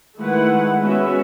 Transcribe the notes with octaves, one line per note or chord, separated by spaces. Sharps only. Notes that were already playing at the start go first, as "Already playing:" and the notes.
D#3 G#3 A3 E4 B4 F#5
G#3 B3 C#4 F#4 E5